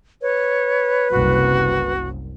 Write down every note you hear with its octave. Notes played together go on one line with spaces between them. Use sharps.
B4 C#5
F#1 C2 F#4